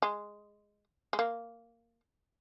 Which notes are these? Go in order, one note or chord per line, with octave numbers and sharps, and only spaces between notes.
G#3
G#3
A#3